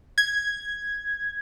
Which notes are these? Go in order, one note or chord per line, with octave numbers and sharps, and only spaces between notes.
G#6